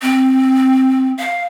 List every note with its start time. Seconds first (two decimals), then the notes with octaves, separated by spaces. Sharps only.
0.02 C4
1.19 F5